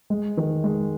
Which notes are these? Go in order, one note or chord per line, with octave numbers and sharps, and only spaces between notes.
G#3
D#3
G#3